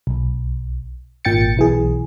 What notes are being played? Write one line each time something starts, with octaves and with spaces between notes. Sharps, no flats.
B1
G#1 A#2 G5 A6 C#7
B1 E3 G#4